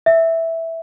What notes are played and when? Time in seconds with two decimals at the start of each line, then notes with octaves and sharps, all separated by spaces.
0.06 E5